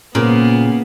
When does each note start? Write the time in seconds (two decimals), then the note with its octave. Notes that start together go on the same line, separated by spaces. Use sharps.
0.15 A#2 C#3 A#3 B3